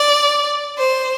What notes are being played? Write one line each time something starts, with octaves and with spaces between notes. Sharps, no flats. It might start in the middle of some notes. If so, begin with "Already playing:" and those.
Already playing: D5
C5